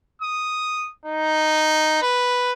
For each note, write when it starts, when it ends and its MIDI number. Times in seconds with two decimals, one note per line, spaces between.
0.22 0.91 87
1.05 2.00 63
2.02 2.52 71